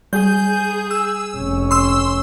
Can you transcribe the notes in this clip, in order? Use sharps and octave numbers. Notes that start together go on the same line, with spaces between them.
G3 G#4 G6
E6
F1 C#4
C6 E6